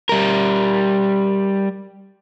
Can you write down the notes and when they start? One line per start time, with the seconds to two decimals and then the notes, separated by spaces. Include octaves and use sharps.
0.09 G3 A#4